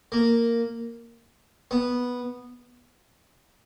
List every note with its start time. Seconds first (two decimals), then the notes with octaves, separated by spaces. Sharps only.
0.12 A#3
1.71 B3